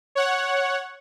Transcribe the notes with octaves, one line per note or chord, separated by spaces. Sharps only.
C#5 F#5